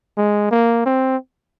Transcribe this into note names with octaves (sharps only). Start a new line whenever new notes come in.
G#3
A#3
C4